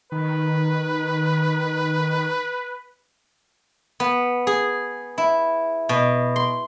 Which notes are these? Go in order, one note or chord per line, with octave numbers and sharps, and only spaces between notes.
D#3 B4
B3
G#4
E4
B2
C6